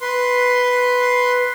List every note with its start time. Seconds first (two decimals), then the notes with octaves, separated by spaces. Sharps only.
0.01 B4 C6